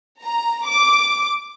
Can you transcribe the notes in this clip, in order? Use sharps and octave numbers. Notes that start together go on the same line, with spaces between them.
A#5
D6